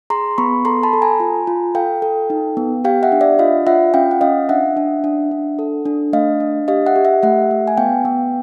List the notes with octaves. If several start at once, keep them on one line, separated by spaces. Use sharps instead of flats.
G#4 A#5 C6
B3 B5 C#6
A4 A#5 C6
A5 B5
A4
G#5 A#5
F4
F4
A4 F5 G5
A4
D#4
B3
G4 F5 G5
E5 F#5
D4
D5 E5
F4 D#5 F5
F4 E5 F#5
C#4 F5 G5
F#5
C#4 D#5 F5
D4 E5 F#5
D4
D4
D4
A4
D4
A3 D#5 F5
D4
G4 D#5 F5
E5 F#5
G4
E5 F#5
A3 E5 F#5
A3
G#5
B3 F5 G5
B3